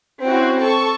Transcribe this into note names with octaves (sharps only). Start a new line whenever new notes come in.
C4 C#4 E4 F#4
A4 A5 C#6